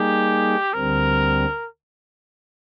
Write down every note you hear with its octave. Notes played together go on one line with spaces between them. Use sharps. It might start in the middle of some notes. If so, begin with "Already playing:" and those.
Already playing: G3 A#3 D#4 G4 G#4
D2 D3 G3 C4 A#4